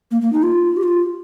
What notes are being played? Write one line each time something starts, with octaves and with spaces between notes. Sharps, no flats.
A#3
A#3
D#4
F4
G4
F4